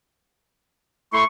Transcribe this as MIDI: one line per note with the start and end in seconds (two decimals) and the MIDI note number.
1.13 1.24 57
1.13 1.24 64
1.13 1.24 84
1.13 1.22 85